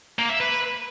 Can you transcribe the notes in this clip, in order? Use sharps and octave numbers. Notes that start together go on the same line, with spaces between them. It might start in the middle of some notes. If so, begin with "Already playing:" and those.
A#3
E5
B4